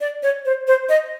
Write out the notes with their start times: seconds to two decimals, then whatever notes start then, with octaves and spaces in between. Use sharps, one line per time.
0.01 D5
0.23 C#5
0.45 C5
0.68 C5
0.89 D#5